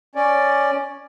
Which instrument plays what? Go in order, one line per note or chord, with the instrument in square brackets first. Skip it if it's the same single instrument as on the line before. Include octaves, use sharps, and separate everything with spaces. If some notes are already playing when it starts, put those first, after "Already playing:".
[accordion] C#4 D5